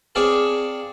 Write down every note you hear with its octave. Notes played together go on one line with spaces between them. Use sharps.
C4 G#4 C#5 D5 F5 A5